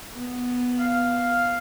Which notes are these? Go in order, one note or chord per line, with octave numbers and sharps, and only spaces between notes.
B3
F5